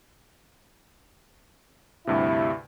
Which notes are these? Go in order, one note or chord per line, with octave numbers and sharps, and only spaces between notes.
D2 G2 C3 E4